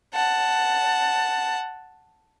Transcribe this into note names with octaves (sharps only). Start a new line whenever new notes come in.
F#5 A5